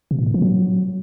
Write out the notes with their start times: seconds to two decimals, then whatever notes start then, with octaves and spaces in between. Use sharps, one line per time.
0.11 C3
0.19 A#2
0.26 A2
0.34 F3
0.42 F#3